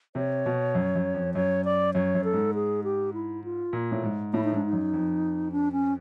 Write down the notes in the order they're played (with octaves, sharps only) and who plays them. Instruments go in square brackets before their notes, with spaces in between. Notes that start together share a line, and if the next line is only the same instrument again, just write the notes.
[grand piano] C3 [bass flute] C#5
[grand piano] B2
F#2
F#2
F2
[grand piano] F#2 [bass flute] C#5
[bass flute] D5
[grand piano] F#2 [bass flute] C#5
[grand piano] F#2
[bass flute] A4
[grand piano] G#2
[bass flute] G#4
G4
E4
F4
[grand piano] A#2
A2
G#2
[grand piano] A2 [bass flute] E4
[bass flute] D#4
[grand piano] G#2 [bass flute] D4
[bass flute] D#4
[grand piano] F#2
F2
[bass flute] D4
C#4